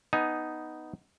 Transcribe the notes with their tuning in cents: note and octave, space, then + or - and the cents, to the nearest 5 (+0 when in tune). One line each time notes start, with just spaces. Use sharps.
B3 +0 D#4 +0 G#5 +15